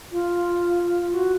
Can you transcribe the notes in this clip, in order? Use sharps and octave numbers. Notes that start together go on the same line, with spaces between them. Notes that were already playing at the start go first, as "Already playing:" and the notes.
F4
F#4